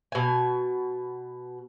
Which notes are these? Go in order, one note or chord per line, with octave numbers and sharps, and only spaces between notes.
B2 G#5